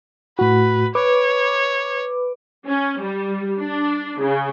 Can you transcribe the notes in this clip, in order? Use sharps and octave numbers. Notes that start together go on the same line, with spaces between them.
A2 F#4 B4
B4 C#5 D6
C#4
G3
D4
C#3